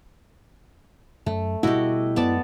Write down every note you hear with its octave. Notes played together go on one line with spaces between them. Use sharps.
F#2 A3
B2 G3 A3 E4 F#4 G4 D#5
F#2 G#3 B3 D5 A5